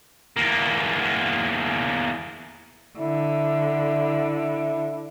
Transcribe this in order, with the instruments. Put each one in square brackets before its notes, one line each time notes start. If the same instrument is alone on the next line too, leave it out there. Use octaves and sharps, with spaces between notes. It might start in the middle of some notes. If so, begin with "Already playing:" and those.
[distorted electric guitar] E2 A#3
[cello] D3 [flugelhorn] E4